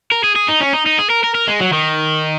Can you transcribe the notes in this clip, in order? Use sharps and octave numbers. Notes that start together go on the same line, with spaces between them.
A#4
G#4
G#4
D#4
C#4
D#4
D#4
G#4
A#4
A#4
A#4
G#3
F#3
D#3